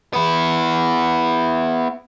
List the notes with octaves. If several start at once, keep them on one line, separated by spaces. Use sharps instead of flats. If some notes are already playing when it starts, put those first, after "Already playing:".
B3 E4